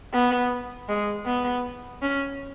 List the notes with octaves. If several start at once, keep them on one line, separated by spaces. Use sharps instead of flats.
B3
G#3
B3
C#4